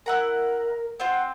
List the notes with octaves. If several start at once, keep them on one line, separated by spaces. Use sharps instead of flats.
E4 A#4 F#5 A#5
C4 F4 F#5